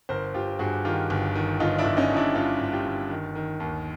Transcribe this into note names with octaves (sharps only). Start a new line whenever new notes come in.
G1 A#4 C5
G1 F4 G4
G2 F#4 G#4
D#3 F4 G4
G1
D#3
G1 D#4 F4
D4 E4
G1
C#4 D#4
G2
D4 E4
G2 D#4 F4
G2
F4 G4
G1
D#3
D#3
D#2